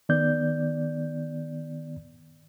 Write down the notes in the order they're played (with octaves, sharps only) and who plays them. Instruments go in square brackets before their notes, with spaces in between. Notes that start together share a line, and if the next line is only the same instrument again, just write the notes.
[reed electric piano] D#3 B3 D5 G6